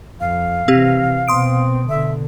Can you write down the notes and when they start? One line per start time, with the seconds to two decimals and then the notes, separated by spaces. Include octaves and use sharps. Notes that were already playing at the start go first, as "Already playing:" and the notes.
0.20 F2 F5
0.68 C3 E3 C4 G4
1.28 B2 C4 C6 D#6 D7
1.89 B2 D3 E5